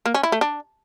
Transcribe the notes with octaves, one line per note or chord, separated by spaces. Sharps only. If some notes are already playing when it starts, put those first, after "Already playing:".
A#3
C#4
E4
A3
D4